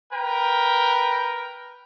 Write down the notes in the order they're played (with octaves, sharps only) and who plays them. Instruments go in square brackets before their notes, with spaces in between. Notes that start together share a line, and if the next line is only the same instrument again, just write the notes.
[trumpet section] A#4 B4 G5